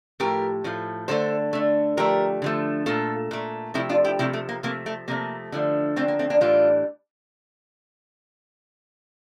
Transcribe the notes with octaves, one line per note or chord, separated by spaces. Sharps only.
A2 F3 A3 G4 A#4
A2 F3 A3
D3 A3 A4 C5
D3 A3
D3 F3 A3 G4 A#4
D3 F3 A3
A#2 A3 F4 A4
A#2 A3
C3 F3 A3 E4 G4
D4 F4
E4 G4
C3 F3 A3 E4 G4
A3
A#3
C3 F3 A3 A#3
A3
C3 F3 A3 A#3
D3 F3 A3
D3 F3 A3 C4
A#3
A3 C4
A#3 D4
A2 E3 G3 D4 F4